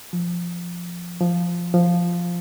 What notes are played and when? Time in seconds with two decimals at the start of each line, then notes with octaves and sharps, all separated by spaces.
0.13 F3
1.20 F3
1.74 F3